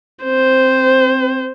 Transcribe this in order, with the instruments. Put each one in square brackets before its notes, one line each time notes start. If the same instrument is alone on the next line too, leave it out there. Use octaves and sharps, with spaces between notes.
[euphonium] C4 [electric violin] C5